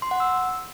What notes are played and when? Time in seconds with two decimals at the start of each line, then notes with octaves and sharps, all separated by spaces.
0.02 C6
0.11 F#5
0.20 E6